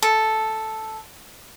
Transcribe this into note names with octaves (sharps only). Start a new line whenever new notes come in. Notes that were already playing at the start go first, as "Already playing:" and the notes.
A4